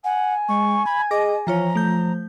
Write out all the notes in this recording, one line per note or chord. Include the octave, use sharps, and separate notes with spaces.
F#5 G#5
G#3 C#6
B5 G#6
G#4 D#5 D6 A#6
E3 F3 F4 C#5 A#5
A3 G6